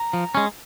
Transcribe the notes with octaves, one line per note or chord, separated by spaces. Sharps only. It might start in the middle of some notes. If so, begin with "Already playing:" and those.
Already playing: A#5
F3
G#3 C#4